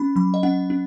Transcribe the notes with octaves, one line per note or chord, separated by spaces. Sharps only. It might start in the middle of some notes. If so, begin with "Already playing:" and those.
Already playing: C#4 B5
F#3 B5
D#5
C#4 F#5
C#4